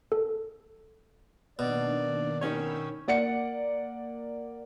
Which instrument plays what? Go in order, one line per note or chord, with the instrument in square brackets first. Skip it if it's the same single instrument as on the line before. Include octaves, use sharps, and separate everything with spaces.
[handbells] A4
[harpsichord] B2 [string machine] D#3 A#3 D4 [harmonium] D5
[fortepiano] D#3 C#4 C#5 [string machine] B5 E6 G6
[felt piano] A#3 D5 F#5 C#7